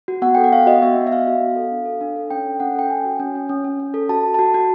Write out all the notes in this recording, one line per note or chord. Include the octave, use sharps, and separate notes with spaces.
F#4
B3 F#5
A4 G5
F#5
B3 F5
F#4 D#5
B3 E5
B3
E5
F#4 F5
F#4
B3
A4
D4
A4
D4
A4
C#4 G5
A4
C#4 F#5
A4 G5
C#4 G#5
F#4
C#4
C#4
C#4
C#4
C#4
A4
F#4 A5
A4
F#4 A5
F#4